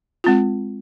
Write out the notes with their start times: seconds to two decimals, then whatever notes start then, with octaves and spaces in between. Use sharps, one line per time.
0.24 G#3 C4 F4